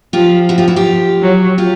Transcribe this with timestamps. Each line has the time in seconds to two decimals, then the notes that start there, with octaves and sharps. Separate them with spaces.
0.13 F3 F4 G4
0.49 E4 F#4
0.58 F4 G4
0.68 E4 F#4
0.76 F4 G4
1.22 F#3
1.58 F4 G4